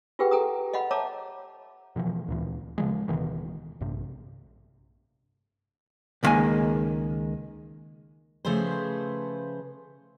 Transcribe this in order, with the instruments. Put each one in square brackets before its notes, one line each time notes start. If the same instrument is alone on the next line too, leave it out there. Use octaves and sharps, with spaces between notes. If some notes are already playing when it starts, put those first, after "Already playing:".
[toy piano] F4 G4 G#4 B4 F#5 G5
A4 G5 A#5 D#6
D#5 F5 F#5 B5
C#5 E5 F5 A5 A#5 D6
[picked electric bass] B2 D3 E3 F3
D2 A#2 E3
C#3 E3 F3 G#3
D1 B2 D#3 E3
A#1 G2 C3
[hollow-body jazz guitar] C#2 A2 D#3 G#3 A#3 G#5
[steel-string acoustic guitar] C#3 F3 A3 G#4 B4 C5